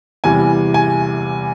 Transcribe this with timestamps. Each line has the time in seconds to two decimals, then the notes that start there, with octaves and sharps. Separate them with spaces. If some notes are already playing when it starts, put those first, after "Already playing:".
0.24 E2 C3 E3 G3 G#5
0.74 G#5